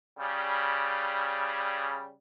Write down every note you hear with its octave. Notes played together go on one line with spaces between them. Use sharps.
C#3 G3